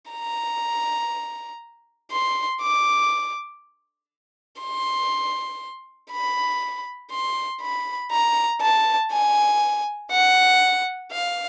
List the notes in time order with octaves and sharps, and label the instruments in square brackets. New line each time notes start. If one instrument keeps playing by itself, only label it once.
[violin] A#5
C6
D6
C6
B5
C6
B5
A#5
A5
G#5
F#5
F5